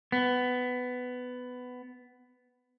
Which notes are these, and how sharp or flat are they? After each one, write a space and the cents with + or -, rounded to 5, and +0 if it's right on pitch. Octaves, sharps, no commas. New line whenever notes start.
B3 +15